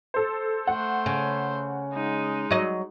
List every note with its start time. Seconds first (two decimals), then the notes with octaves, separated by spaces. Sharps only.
0.14 A4 C5
0.67 A3 C5 F#5
1.06 C#3
1.93 G#3 D#4
2.51 F#3 D#5